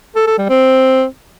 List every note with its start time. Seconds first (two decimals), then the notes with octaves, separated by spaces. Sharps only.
0.15 A4
0.27 A4
0.38 G3
0.49 C4